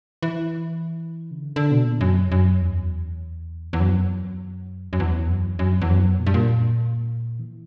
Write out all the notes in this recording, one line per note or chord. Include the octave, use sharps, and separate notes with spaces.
E3
C#3
D3
D3
B2
A#2
F#2
F#2
E2
E2
F#2
F#2
E2
F#2
F#2
E2
F#2
A#2
G2
A#2
E3